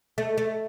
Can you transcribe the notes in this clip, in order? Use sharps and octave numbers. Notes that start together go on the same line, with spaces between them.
A3
A3